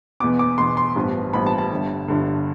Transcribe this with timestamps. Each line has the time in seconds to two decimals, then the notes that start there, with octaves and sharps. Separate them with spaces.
0.20 E2 B2 B3 D6
0.39 D6
0.58 E2 B2 B3 C6
0.77 C6
0.96 A1 G2 F3 B3
1.33 A1 G2 F3 B3 B5
1.46 A5
1.58 A5
1.71 G1 G2 D3
2.08 G1 G2 D3